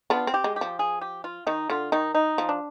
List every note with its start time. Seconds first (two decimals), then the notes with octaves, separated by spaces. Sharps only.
0.10 B3 D4 F4
0.27 C4
0.34 G4
0.44 G#3
0.56 G4
0.61 F3
0.79 G#4
1.01 G4
1.24 F4
1.47 D#3 D#4
1.70 D3 F4
1.92 D#3 D#4
2.15 D#4
2.38 F3
2.49 D4